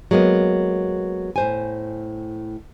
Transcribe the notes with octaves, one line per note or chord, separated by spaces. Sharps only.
F#3 G#3 A#3 B3
A2 C5 G#5